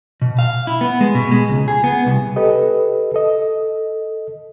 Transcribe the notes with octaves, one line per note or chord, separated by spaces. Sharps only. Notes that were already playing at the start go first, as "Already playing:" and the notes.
B2
F5
E4
B3
G#3
B2
G#3
C#2
G#4
B3
C2
G4 A4 B4 D#5
A4 D#5